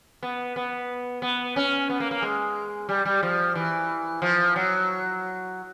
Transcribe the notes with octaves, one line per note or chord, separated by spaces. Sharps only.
B3
B3
B3
C#4
B3
A#3
A#3
G#3
G3
G3
F3
E3
F3
F#3